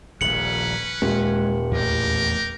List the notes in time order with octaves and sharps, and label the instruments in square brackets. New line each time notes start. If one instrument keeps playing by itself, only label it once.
[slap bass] D#1 A#1 [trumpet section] C#4 B4 [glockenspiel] C#7 F#7
[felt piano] D#1 [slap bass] G#3
[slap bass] A1 E2 [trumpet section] G4 A#4